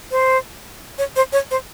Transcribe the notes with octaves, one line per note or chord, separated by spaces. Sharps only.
C5
C#5
C5
C#5
C5